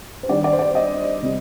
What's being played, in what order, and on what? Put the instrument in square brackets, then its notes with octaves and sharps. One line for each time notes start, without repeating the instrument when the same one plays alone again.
[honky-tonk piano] C5
D#3 G3 D4 D5
D5
C5
D5
D#5
C3 G3